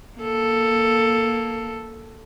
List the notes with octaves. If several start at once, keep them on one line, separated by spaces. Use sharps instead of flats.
A#3 A4